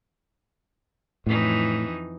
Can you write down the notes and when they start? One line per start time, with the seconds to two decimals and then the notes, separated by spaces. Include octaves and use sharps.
1.26 F2 A2 E3 D#4